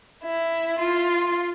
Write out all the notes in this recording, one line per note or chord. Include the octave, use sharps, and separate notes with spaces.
E4
F4